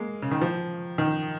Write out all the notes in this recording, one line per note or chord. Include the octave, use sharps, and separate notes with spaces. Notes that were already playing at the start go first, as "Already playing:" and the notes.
Already playing: G#3 A#3
C#3
D#3
F3
D#3